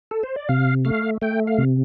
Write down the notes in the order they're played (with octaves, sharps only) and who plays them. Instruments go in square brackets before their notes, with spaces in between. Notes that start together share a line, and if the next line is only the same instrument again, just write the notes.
[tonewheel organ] A4
C5
D5
C3 F5
A3 F5
A3 G5
F5
C3